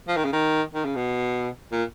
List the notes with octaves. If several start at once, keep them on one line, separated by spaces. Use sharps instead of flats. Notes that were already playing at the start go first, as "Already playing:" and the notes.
F3
D#3
C#3
D#3
D#3
C#3
B2
A#2